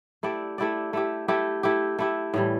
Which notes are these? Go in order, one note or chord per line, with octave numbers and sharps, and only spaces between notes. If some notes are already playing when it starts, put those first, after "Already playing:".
A3 E4 G4 D5
A3 E4 G4 D5
A3 E4 G4
A3 E4 G4
A3 E4 G4
A3 E4 G4
A2 E3 G3